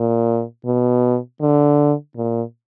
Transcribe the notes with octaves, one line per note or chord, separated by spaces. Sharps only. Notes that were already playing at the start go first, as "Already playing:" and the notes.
Already playing: A#2
B2
D3
A#2